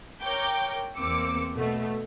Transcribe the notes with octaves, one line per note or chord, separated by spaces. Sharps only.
A#4 C#5 G5 D6 G6
E2 A#3 C4 D6 E6 C#7
B2 A3